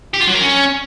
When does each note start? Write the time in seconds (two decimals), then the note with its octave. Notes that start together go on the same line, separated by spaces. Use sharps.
0.14 G4
0.21 F4
0.27 F#3
0.34 A#4
0.41 C#4